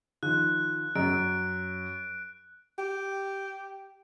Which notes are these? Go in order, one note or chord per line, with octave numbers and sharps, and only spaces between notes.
D#3 F3 F#6
F#2 A#5 D7
G4